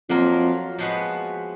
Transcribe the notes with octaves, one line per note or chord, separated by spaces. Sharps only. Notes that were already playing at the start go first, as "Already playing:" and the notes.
F2 F#3 A#3 F4 A#4
F3 G#3 B3 F#4 B4